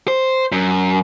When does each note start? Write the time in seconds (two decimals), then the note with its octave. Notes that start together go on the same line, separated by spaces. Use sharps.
0.08 C5
0.52 F#2